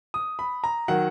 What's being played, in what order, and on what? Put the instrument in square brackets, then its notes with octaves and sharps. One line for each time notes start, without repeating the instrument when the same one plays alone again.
[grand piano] D#6
B5
A#5
D#3 F#3 F#5